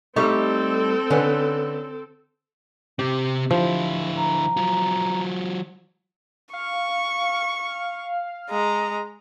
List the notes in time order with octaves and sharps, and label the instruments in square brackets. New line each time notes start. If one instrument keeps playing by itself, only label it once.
[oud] G3 A3 D#4 [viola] C4 A4 [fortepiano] C#6
[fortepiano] D3 B4 [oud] C#4
[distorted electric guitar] C3 C4 [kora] G4
[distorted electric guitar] D3 E4 [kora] F3
[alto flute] A#5
[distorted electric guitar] F#3 F4
[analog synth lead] F5 [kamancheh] C#6
[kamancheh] G#3 A#5